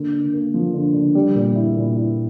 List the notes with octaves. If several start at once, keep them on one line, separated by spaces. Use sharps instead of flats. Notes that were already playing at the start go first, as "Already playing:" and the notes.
Already playing: D3 A#3
D3
A#3
F3
D3
D3
G3
A#2
E4
A#2
E4